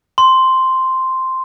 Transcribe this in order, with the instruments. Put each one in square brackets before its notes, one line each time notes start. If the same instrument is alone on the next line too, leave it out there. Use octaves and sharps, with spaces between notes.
[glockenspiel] C6